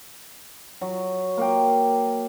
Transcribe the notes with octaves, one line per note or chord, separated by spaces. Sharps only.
F#3
A#3 G5